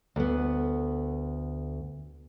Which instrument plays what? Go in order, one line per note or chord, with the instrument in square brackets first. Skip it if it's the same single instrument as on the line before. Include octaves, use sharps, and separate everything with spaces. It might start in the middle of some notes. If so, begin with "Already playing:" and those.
[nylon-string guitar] D2 B3